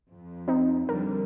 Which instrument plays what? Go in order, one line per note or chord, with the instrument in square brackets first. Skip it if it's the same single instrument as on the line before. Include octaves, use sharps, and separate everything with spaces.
[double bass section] F2
[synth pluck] C4 D#4
[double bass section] D3 F3 G3 [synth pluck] A#4